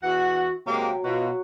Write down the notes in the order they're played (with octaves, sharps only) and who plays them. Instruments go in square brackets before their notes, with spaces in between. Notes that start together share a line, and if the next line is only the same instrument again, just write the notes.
[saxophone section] E2 E3 F#5 [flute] F#4
[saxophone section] C3 G#3 A#3 [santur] F#3 [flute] G5
[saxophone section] B2 [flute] F4 [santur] F#4